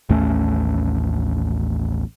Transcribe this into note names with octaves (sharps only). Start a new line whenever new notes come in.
A1 D#2 A3 C#4